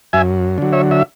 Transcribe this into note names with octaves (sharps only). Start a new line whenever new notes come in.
F#2 E5 G#5
D3 F#3
C#5 E5
E5